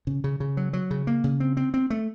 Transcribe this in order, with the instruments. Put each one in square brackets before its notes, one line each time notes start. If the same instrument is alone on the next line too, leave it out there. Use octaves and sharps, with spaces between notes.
[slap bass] C#3
C#3
C#3
F#3
F#3
C#3
A#3
C#3
C4
C4
C4
A3